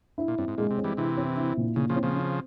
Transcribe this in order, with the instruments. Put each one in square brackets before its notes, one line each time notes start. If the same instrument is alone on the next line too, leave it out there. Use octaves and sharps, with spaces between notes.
[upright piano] E4
[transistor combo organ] A#2
[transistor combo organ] G2 [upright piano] C4
[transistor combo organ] G#2
[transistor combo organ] A#2 [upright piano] G#3
[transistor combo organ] C3
[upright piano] C4
[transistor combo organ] E3 G3
[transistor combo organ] C3 E3 [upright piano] E4
[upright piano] C4
E4
A#2
[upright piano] A#2 [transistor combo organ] C#3
[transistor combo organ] C#3 F3
[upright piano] C4
[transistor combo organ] C#3 F3
[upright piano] C4